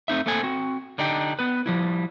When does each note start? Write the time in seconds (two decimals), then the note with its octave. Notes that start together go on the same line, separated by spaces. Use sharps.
0.08 A3 C4 D#4 E5
0.26 A3 A#3 C4 A4 G#5
0.43 C4 F#4
0.98 D3 D4 D#4 G4 G5
1.39 B3 B4
1.66 F3 G3 E4